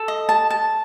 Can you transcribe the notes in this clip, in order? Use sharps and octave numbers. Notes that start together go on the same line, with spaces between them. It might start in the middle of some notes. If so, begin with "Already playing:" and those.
Already playing: A4
D#5
A5
A5